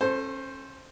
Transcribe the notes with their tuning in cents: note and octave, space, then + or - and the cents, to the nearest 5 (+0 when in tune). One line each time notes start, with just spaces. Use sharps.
C#4 -35 A4 +0 C5 +0